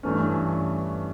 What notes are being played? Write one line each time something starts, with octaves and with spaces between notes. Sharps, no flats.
G2 E3 A3 C#4